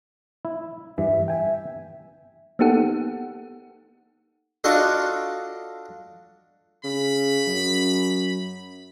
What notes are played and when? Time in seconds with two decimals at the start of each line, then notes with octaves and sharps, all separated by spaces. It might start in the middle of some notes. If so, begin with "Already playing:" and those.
0.45 E4
0.98 G2 E3 E5
1.28 E5 G5 G#5
2.59 A#3 B3 D#4 G4 A4 F#5
4.64 D4 F4 F#4 A4 D#5
6.84 C#3 B5
7.47 F#2